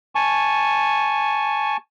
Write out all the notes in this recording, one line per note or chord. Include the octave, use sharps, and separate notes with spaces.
G#5 A5 C#6